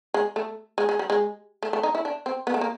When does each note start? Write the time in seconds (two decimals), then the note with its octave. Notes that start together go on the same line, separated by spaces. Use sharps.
0.14 G#3
0.36 A3
0.78 G#3
0.89 G#3
0.99 G3
1.10 G#3
1.63 A3
1.73 A3
1.83 D#4
1.95 E4
2.05 D4
2.26 C4
2.47 B3
2.54 A3
2.61 A#3